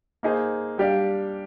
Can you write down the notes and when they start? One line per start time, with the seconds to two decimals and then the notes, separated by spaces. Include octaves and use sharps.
0.23 A#3 D#4 G#4 C5
0.78 G3 D4 G4 D5 F5